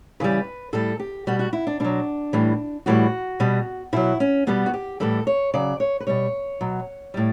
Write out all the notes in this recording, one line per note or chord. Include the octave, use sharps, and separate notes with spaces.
C#3 E3 G3 B4
A2 G3 A4
G4
B2 G3 F#4
F#4
E4
D4
B2 F#3 D4
A2 E3 G3
A2 E3 G3 F#4
B2 G3
B2 F#3 E4
C#4
B2 G3 B3
F#4
G4
A2 E3 G3 A4
C#5
C#3 F#3 D5
C#5
B4
B2 G3 C#5
B2 F#3
A2 G3